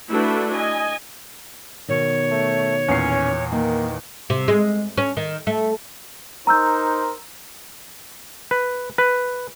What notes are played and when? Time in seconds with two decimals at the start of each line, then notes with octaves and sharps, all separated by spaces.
0.10 A3 D4 E4 F#4 A4 B4
0.53 D#5 G#5
1.88 B2 D#3 C#5
2.31 A3
2.88 E2 A#2 C#4 C7
3.52 D#3 A#3
4.30 C3
4.48 G#3
4.98 C#4
5.17 D#3
5.47 A3
6.47 D#4 A#4 C5 A#5 E6 G6
8.51 B4
8.98 B4